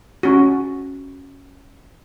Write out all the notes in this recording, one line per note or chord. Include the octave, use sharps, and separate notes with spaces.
C#4 F#4